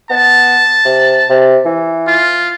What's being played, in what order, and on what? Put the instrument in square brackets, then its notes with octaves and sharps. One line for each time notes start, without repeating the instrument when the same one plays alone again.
[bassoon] B3 [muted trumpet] A5
[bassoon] C3
C3
E3
[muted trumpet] F4